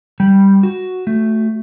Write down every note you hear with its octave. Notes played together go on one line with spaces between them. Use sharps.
G3
F#4
A3